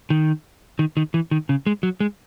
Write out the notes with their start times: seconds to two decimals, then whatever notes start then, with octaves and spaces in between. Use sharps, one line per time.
0.10 D#3
0.79 D#3
0.97 D#3
1.14 E3
1.31 D#3
1.49 C#3
1.66 G#3
1.83 F#3
2.00 G#3